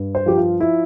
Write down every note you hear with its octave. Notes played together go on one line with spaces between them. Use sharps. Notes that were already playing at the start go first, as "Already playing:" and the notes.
Already playing: G2
C5
F3 G4
F4
E4